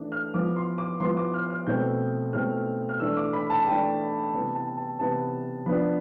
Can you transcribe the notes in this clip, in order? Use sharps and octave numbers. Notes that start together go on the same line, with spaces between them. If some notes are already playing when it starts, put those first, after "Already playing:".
Already playing: E3 A3 D4 D6
F6
F3 B3 E4 D6
C6
D6
F3 B3 E4 C6
D6
F6
F6
B2 A3 C4 E4 G6
B2 A3 C4 E4 F6
F6
E3 A3 D4 E6
D6
B5
A5
E3 A3 D4 G5
C3 E3 B3 E4 A5
A5
A5
C3 E3 B3 E4 A5
F3 B3 D4 B5